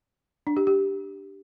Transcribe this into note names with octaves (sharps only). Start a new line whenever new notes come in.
D4
G4
G4